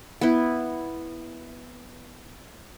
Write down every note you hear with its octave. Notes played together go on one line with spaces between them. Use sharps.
B3 E4